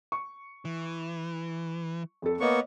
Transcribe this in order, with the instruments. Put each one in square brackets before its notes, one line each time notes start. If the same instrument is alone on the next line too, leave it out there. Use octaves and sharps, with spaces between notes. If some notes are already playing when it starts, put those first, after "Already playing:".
[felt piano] C#6
[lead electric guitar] E3
[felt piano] F2 A4
[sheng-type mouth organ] A#3 B3 C#6 [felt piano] C#5 D#5